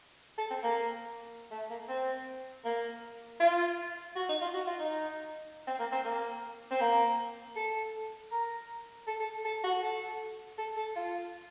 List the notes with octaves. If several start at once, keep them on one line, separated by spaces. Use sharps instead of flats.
A4
C4
A#3
A3
A#3
C4
A#3
F4
F#4
D#4
F4
F#4
F4
D#4
C4
A#3
C4
A#3
C4
A#3
A4
A#4
A4
A4
A4
F#4
A4
A4
A4
F4